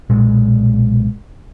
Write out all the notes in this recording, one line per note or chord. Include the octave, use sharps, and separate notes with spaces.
B1 A#2 G#3